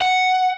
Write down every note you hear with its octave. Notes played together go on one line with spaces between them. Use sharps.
F#5